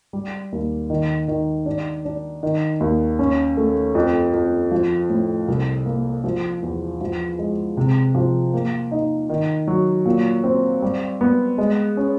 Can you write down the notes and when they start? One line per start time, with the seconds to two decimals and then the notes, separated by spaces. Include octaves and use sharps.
0.13 G3
0.52 D#2
0.90 D#3
1.28 D#3
1.66 D4
2.05 D4
2.43 D#3
2.80 D#2
3.19 C#4
3.57 A3
3.95 F2
4.33 F2
4.71 F3
5.10 A2
5.48 C2
5.86 A#3
6.24 F3
6.63 E2
7.01 F3
7.39 G#3
7.77 C3
8.15 F3
8.54 A#3
8.91 D#4
9.29 D#3
9.68 F#3
10.06 A#2
10.44 C4
10.82 G3
11.21 B3
11.58 G#3
11.97 C#4